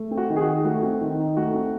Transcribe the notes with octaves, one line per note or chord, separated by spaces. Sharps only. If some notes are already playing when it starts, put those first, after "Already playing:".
Already playing: A3
C4
F#4
D#3
G#4
F#4
D#4
A3 F#4
C4
D#3
D#4
A3 F#4
C4